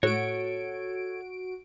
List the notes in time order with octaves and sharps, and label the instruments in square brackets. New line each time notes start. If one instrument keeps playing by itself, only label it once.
[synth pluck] A2 [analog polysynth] F#4 D7 [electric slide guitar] A4 C#5